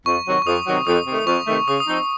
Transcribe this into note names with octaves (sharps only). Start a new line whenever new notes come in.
F2 C#6
C3 D#3 F#3
C#6
F2 D#6
C3 D#3 F#3
F2 D#6
C3 D#3 A3
D#6
F2 C#6
C3 D#3 A3
C#3 D#6
D#6
F3 C4 D#4
D#6